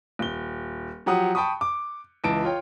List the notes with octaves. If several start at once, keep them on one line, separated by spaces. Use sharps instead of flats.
D#1 G7
F3 F#3 G4 F#5 D#6
G5 A5 B5 C#6 D#6
D6
C#2 E3 A5 D7
F4 C#5 G5